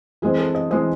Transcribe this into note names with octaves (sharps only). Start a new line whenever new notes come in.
E3 G#3 C4 G#4
A4
D#5
E3 G#3 C4 D#5